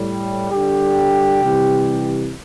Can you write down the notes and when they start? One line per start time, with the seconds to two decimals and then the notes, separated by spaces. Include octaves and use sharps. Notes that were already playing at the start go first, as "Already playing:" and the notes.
Already playing: A2 G3
0.50 D3 G3 G4
1.42 C3 E3 G3